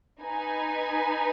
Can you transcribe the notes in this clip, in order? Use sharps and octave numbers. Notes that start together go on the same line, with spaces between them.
D#4 B4 G#5